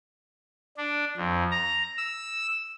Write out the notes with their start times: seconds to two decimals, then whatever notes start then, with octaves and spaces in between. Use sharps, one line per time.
0.77 D4
1.17 F2
1.51 A#5
1.98 E6